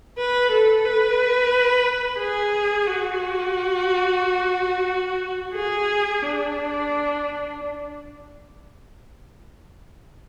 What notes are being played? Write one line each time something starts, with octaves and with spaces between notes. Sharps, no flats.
B4
A4
B4
G#4
F#4
G#4
D4